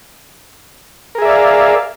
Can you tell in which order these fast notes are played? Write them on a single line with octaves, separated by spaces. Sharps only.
A#4 G#4 E5 D5 F5